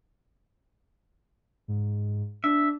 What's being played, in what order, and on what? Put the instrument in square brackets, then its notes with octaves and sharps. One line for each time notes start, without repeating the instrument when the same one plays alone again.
[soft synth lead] G#2
[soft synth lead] D4 [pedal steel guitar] E5